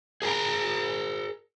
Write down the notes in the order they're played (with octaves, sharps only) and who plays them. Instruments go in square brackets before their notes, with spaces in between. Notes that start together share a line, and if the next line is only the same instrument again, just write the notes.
[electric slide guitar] G#4 A#4 G#5 A#5